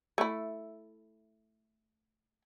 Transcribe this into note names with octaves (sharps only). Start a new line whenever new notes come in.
A3 E4